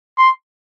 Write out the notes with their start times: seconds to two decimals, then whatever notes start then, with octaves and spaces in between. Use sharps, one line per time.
0.18 C6